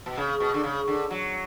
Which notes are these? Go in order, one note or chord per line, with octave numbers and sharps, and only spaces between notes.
B2
C#3
B2
D3
C#3
D3
F#3